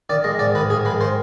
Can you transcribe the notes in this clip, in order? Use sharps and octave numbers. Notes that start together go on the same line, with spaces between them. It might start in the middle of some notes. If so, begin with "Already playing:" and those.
D#3 D5
G#3 D#5
G#2 D5
D#3 B4
G#2 G#4
G#3 B4
D#3 C5